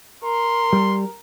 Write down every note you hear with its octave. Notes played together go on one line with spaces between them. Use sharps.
A#4 C6
G3